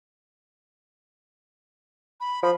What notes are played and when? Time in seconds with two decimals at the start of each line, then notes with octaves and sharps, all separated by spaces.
2.20 B5
2.43 F3 B5